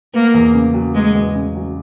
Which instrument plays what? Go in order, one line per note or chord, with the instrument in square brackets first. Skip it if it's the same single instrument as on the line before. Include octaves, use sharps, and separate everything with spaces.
[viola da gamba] A#3 [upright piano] B3
[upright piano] E2
C#3
F#3
[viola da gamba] G#3 [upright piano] B3
[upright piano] E2
C#3
F#3